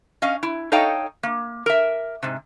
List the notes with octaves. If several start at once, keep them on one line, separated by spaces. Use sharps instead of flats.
C#4 D#5 F5
E4
D#4 A4 C#5 D#5 F5 G5
A#3
A#4 E5
G#2 C3